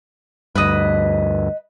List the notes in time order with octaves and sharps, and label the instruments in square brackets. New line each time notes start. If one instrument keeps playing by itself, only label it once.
[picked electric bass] D2 G2 [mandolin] B4 D#5